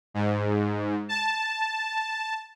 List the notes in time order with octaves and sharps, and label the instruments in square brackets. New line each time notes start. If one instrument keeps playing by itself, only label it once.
[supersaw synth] G#2
A5